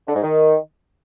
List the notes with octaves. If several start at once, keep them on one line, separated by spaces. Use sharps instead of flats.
D3
G#2
D#3